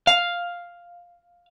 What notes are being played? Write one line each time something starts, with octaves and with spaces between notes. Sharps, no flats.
F5